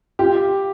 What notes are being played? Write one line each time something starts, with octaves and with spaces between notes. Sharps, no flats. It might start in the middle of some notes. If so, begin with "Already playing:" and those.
F4 G4